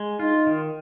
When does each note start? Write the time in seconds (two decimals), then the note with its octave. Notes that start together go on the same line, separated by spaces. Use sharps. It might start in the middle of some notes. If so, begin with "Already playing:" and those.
Already playing: G#3
0.20 D#4 F4
0.47 D#3